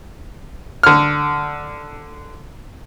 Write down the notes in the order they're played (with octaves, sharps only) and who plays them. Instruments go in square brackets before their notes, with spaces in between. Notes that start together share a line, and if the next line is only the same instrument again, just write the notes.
[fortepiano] D3 F6